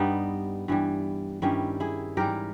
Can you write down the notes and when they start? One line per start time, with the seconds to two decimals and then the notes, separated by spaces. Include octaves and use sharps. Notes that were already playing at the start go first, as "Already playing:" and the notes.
Already playing: G2 G3 B3 D#4
0.68 G2 E3 G3
1.42 G2 D#3 G3 C#4 E4
1.80 E4 G#4
2.17 G#2 E3 G3 G4 A#4